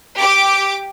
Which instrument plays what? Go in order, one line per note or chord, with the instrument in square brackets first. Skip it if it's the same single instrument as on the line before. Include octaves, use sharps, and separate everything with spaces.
[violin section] G4 D6